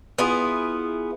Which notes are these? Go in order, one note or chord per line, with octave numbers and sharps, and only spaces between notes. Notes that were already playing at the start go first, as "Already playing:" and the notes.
B3 E4 F4 G#4